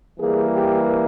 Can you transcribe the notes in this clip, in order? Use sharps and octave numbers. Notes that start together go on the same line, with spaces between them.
E3 G3 A#3 G#4
G4